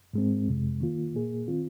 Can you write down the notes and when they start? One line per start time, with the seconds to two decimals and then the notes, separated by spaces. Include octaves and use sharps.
0.14 G#2 G#3 C4
0.47 F2 C3 G#3
0.80 D#3 A#3 F4
1.15 A#2 A#3 G#4
1.48 D#3 C4 F4